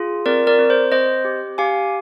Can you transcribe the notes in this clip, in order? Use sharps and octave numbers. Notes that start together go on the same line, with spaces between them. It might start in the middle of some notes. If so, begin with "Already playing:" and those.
Already playing: F4 G#4
C4 A#4 D5
A#4 D5
C4
C5
C4 C5 D#5
G4
G4 F5 G#5